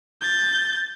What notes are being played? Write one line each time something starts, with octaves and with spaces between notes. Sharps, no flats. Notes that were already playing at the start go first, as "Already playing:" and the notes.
G6 A6